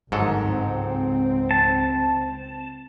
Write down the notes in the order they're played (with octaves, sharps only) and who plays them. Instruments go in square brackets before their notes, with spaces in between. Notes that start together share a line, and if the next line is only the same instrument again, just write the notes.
[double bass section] G1 D#3 [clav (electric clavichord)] G#2 F#3 A4
[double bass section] C#2 C4
[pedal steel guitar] A5